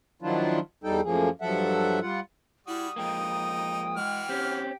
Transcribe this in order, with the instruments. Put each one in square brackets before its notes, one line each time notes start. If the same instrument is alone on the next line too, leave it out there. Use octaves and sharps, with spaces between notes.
[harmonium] D#3 F3 F#3 D4 E4 F4
E2 G3 D#4 A4 G5
F#2 A2 F3 A#3 G#4
G2 F3 F#3 A4 E5 F#5
G3 F4 F#5
[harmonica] G3 F#4 [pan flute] E4 [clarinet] D#6
[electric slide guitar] F3 G#3 A#3 [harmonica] D#4 [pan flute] G5
[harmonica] E3 F#4 F6 [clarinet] G#3
[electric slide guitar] C4 C#4 [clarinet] G4